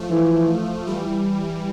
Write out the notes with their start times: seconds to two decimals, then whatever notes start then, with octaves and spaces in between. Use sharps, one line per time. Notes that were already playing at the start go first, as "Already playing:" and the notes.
Already playing: F3 A3
0.09 E3
0.87 E3 G3